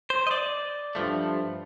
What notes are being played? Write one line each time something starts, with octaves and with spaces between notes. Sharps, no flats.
C5
D#5
D5
G2 F3 A3